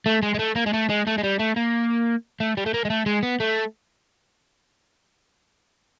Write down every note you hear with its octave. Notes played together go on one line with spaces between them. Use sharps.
A3
G#3
G#3
A3
A#3
G#3
A3
G#3
A3
G#3
G3
A3
A#3
A3
G3
A3
A#3
G#3
A3
G#3
B3
A3